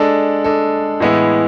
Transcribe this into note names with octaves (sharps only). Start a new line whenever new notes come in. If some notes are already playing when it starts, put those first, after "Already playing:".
Already playing: G#3 D4 A4
G#3 D4 A4
A2 E3 G#3 B3 E4